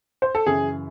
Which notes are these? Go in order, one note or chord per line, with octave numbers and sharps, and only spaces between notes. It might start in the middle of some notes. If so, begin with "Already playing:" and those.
C5
A4
F#2 C#3 E3 G#4